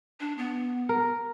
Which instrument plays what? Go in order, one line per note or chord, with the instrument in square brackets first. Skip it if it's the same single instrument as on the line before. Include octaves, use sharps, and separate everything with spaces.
[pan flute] D4
B3
[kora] A#4